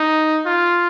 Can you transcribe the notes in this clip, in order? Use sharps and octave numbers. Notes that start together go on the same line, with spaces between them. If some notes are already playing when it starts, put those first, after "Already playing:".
Already playing: D#4
F4